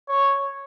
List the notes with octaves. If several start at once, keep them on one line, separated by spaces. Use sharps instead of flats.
C#5